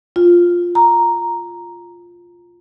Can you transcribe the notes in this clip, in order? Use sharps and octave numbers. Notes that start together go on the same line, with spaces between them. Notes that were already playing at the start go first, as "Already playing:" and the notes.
F4
A#5